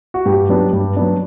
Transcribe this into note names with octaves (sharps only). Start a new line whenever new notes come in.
F#4
G2 G4
F#3 B3 D4
G2
F#3 B3 D4